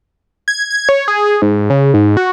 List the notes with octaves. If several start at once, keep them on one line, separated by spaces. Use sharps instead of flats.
G#6
G#6
C#5
G#4
G#2
C#3
G#2
F#4